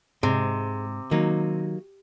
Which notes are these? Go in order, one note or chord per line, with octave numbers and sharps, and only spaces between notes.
G#2 C3 G#3
D#3 F#3 A#3 D#4